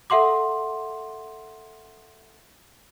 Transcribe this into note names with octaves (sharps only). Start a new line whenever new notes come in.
A4 E5 F#5 C6 D6